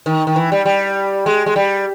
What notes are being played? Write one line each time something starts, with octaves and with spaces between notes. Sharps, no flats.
D#3
D#3
E3
G3
G3
G#3
G#3
G3